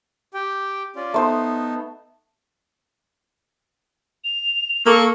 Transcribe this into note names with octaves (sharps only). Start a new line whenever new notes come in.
G4 G5
C#4 F4 D5
A3 B3 D#4 C5
F7
A#3 A4 C#6